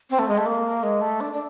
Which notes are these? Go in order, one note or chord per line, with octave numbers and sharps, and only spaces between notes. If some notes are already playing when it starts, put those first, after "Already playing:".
C4
A3
G#3
A3
A#3
G#3
A3
D4
D4